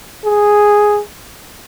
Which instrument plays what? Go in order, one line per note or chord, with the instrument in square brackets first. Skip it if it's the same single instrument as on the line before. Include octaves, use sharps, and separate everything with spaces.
[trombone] G#4